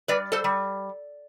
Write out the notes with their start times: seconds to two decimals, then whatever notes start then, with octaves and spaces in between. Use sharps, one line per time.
0.08 G3 B4 D5
0.32 A4 C5
0.44 G3